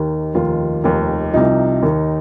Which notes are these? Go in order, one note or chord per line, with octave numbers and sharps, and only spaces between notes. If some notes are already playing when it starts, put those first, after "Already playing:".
Already playing: D#2 D#3 G4
F1 D#2 D#3 F4
F1 D#2 D#3
C2 C3 F3 D#4
D#2 D#3